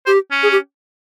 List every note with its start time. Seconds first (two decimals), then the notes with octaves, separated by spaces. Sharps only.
0.06 G4 C5
0.31 C#4
0.43 G#4
0.52 G4